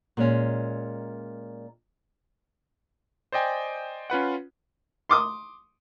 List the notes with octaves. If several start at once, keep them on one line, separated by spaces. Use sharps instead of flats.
A#2 G#3 C#4
C5 D5 D#5 G5 G#5
C#4 F4 B4 F#5
C6 D6 D#6